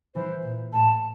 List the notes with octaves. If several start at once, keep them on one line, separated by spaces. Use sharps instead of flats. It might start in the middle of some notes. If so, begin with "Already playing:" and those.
E3 C5
A#2
A2 A5